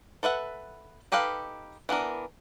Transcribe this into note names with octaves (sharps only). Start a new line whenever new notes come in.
A4 B4 E5 F#5
D#4 G4 A4 B4 F5
E3 B3 D4 A#4